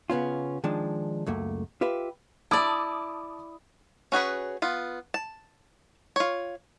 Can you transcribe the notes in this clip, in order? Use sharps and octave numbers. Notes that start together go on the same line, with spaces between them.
C#3 B3 C#4 F4
D#3 F3 G#3 D4
C#2 F#2 A3 A#3
F4 G4 B4 E5
E4 D5 A5 D6 D#6
C#4 F#4 G#4 B4
B3 F4
A5
F4 C#5